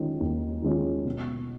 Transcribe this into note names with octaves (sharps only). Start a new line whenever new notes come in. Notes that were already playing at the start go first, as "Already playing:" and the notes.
Already playing: D#3 G#3 C#4 F4
D#2
D#3 G#3 C#4 F4
B2